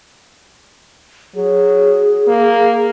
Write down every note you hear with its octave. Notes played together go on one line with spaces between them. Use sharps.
F#3 G#4
A#3